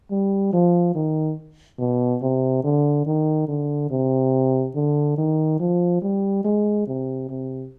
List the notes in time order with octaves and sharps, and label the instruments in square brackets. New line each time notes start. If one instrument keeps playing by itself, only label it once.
[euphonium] G3
F3
D#3
B2
C3
D3
D#3
D3
C3
D3
D#3
F3
G3
G#3
C3
C3